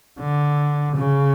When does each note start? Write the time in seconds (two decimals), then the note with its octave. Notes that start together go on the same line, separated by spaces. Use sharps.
0.19 D3
0.96 C#3